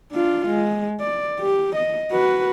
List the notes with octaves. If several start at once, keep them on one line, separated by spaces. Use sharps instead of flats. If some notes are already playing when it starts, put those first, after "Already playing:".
D4 F4
G#3
D5
G4
D#5
F#4 B4